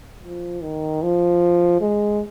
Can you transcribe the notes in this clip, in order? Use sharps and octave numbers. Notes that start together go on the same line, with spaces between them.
F3
D#3
F3
G#3